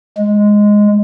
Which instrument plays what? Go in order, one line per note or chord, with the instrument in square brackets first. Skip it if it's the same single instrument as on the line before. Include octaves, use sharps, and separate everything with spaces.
[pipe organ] G#3